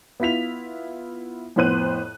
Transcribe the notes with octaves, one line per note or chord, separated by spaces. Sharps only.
B3 E4 F4 B6 F7
F2 A2 B3 C5 F#6 D#7